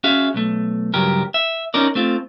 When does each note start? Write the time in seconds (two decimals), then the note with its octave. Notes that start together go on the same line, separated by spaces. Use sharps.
0.04 C#4 F#4 G#4 E5 F5
0.34 B1 A3
0.94 C#2 G2 F#3 G4 A#4
1.34 E5
1.74 C#4 D#4 A#4 D5
1.95 A3 C4 F4